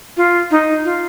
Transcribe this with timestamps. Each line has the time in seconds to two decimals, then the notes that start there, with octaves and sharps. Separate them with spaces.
0.17 F4
0.51 D#4
0.85 F4